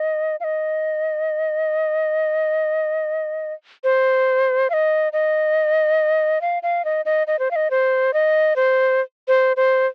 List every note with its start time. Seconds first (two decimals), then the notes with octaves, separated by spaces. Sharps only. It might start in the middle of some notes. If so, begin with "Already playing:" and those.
Already playing: D#5
0.40 F5
0.44 D#5
3.84 C5
4.70 F5
4.73 D#5
5.13 D#5
6.41 F5
6.63 F5
6.85 D#5
7.05 D#5
7.27 D#5
7.39 C5
7.51 F5
7.56 D#5
7.71 C5
8.14 D#5
8.56 C5
9.28 C5
9.57 C5